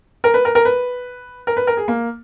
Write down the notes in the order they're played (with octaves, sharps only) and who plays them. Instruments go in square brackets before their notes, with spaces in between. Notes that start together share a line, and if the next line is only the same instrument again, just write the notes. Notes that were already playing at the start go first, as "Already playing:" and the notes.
[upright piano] A#4
B4
A#4
A#4
B4
A#4
B4
A#4
G#4
A#3